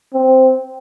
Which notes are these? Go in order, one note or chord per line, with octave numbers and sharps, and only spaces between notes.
C4